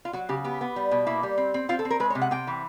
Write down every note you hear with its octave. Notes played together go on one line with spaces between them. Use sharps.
F4
F#3 F#4
C#3 G4
B3 G4
B3
G3
B2
A#3 E4
G3
C4
C4
C4 F4
A4
C4
A#4
G#3 B4
C#5
C3
F#5
C3 G5
E3